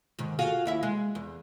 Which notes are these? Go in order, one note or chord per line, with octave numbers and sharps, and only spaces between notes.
G#2 D#3
F4 F#4 G#4
D#2 E4 E5
G#3
E2